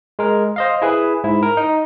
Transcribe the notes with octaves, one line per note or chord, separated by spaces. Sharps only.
G#3 A#4
C5 D#5 F5
E4 G#4 B4
G#2 E4
A#4
D#4